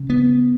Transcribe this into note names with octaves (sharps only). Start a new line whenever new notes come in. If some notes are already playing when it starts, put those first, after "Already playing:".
Already playing: C#3
B3